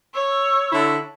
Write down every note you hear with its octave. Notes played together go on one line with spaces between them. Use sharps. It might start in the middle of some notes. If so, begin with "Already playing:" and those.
C#5 E6
D3 E4